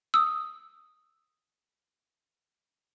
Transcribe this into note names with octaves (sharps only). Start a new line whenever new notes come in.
D#6 E6